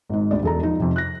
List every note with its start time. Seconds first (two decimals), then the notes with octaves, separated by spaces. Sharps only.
0.09 G#1 G#2
0.31 D2 D5
0.43 E1 A4 A#5
0.63 F3 D#4
0.79 F2 C3
0.96 F#6 A#6